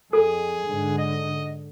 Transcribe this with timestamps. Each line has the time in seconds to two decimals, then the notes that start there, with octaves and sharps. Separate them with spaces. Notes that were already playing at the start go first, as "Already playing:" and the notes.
0.13 F2 G#4 A4
0.67 G#2 D3
0.98 D#5